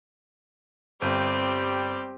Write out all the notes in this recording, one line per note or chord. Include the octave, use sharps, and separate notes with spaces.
G1 G3 C4 G4